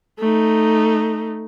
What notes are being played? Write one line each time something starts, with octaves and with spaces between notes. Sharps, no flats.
A3 D#4